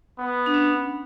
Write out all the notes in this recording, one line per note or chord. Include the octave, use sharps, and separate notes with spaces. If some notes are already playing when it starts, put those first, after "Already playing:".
B3
D4
C#4